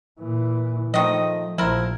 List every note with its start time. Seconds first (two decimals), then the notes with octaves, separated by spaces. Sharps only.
0.20 A#2 E3
0.94 D#3 F3 A3 D#5
1.58 A#1 F3 E4 A#4